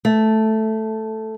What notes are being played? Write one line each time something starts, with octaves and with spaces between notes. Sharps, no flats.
A3